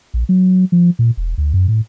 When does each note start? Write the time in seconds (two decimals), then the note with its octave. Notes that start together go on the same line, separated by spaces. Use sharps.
0.14 A#1
0.29 F#3
0.72 F3
0.99 A#2
1.17 E1
1.38 D2
1.54 F#2
1.68 A2